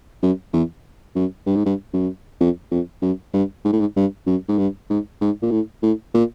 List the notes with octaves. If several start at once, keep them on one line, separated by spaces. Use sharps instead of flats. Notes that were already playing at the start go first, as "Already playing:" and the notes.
F#2
E2
F#2
G2
G#2
G2
F#2
F2
F2
F#2
G2
G#2
A2
G#2
G2
F#2
G#2
G2
G#2
G#2
A#2
A2
A2
A#2